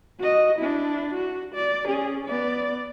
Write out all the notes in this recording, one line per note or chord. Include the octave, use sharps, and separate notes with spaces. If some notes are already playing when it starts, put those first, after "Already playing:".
F#4 D#5
D4 E4
F#4
D5
C#4 G#4
B3 D5